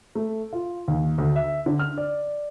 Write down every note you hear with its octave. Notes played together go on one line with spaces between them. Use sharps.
A3
F4
D#2
D2
E5
D3
F6
D5